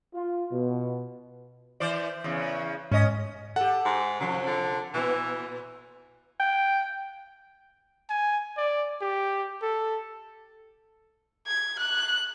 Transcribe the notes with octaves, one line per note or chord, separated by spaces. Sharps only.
F4
B2
E3 C5 D5
E2 C#3
G#2 C#4 D#5
G4 A4 F#5
G#2
F#2 C3 F3
D3
A#2 E3 B3
G5
G#5
D5
G4
A4
G#6
F#6